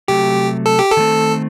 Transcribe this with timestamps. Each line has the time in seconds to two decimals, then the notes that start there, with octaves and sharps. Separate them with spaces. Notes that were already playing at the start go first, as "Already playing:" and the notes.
0.08 C3 F#3 A3 G4
0.66 A4
0.79 G4
0.92 A4
0.97 D#3 A3 C4